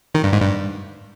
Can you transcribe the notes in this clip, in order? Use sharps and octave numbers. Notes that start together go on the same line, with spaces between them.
D#3
G2
G#2
G2